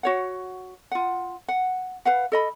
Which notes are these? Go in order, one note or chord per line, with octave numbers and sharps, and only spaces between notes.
F#4 C#5 F#5
F4 F#5
F#5
B4 F5 F#5
A4 D#5 B5